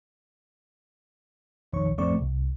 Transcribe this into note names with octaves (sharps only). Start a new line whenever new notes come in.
A#1 F2 D#3 C#5 C#6
A1 F2 A3 C4 D5 C#6
C2